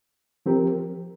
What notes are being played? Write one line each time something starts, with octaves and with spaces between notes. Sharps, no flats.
F3 C4 G4 A#4